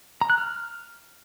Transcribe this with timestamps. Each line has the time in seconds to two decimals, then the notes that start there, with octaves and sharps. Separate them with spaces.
0.21 A#5
0.30 F#6
0.38 F6